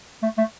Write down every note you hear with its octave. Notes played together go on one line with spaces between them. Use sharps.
A3
A3